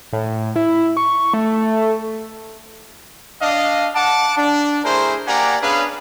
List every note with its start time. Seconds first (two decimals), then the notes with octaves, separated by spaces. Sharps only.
0.13 A2
0.56 E4
0.97 C#6
1.34 A3
3.41 D4 D#5 F5
3.95 F#5 A5 D6
4.36 D4
4.84 A3 E4 G#4 A#4 C5
5.27 A#3 G4 D5 F#5 G#5 A#5
5.62 B3 C#4 D4 G#4 B4 F5